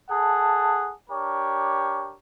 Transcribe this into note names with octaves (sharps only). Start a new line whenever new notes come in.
G#4 A4 F#5 A5
D4 G4 A#4 C#5